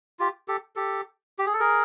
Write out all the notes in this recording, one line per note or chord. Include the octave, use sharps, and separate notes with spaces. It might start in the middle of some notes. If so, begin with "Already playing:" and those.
F4 G4
G4 A4
G4 A4
G4
G#4
A4
G#4 A#4